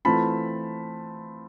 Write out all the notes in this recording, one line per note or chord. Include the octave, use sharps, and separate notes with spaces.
E3 A3 C4 F4 A5 B5